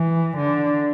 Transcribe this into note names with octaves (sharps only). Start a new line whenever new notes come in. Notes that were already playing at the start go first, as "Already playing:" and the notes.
Already playing: E3
D3